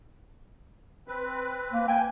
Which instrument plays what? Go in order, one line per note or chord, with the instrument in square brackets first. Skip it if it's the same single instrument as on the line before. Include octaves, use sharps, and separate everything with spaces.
[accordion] C4 B4
[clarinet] A#3
[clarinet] G5 [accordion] G#5